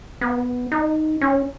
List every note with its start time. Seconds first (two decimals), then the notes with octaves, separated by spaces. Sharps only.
0.21 B3
0.72 D#4
1.21 C#4